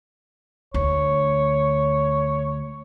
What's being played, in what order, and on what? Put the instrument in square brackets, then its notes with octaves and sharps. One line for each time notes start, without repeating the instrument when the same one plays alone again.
[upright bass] D2 [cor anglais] C#5